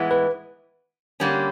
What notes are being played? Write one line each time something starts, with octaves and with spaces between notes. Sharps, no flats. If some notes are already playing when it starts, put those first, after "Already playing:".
Already playing: A2 E3 G#3 B3 E4
B4
D3 G3 A#3 C#4